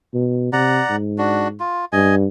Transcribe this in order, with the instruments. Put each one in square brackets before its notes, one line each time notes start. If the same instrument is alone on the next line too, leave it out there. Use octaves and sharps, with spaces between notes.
[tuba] B2
[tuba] C3 [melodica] D5 F#5 A#5
[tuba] G#2
[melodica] D4 F#4
F4
[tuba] G2 [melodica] D#5 G#5